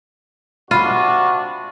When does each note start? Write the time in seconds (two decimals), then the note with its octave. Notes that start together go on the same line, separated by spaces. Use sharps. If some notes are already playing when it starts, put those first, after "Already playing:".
0.71 C3 D4 F4 F#4 B5 D#7